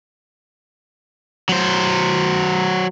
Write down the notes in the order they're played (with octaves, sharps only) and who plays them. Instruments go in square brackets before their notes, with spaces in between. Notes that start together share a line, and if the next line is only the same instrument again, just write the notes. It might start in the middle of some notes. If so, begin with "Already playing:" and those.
[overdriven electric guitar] F#3 C5